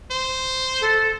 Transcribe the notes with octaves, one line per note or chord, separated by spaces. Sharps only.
C5
A4